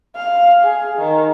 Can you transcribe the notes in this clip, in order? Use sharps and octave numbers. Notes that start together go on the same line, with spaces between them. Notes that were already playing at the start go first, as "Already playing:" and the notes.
F5
G#4
D#3